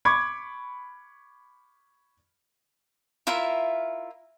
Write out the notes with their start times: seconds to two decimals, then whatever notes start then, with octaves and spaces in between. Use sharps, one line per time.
0.05 B5 C#6 D6 G#6
3.27 E4 F4 A#4 E5